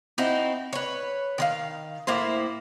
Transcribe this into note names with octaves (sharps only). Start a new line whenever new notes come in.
C4 D#4 E4 F#4
B4 C#5
D#3 C5 F5
A2 A#3 E4 C5